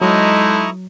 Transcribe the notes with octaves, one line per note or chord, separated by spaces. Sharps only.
F#3 G#3 D#4 E4 A4 A#5 C#6 D#6